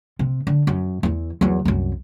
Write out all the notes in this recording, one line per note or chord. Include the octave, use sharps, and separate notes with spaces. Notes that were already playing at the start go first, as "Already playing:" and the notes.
C3
D3
F#2
E2 E3
E2 F#3
C2 F#2